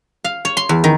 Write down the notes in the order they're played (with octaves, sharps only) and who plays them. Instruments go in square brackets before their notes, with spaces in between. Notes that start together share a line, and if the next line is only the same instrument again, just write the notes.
[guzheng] F5
C#5
C6
E2
D#3